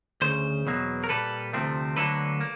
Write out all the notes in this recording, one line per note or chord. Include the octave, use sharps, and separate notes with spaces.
D2 C#3 C5
E2 B2 F#3 A#3
A#4
A#2 G3 A#3 A4 B4
D2 C3 F3 A3 C4
D2 D3 F#3 A#3 A4 B4
A#3